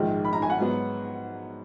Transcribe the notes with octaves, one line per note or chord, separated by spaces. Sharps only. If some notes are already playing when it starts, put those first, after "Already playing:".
Already playing: A#1 G#2 D#3 G#3
B5
A#5
G#5
F#5
G#2 F#3 B3